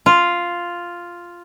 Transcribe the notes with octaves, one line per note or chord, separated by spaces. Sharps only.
F4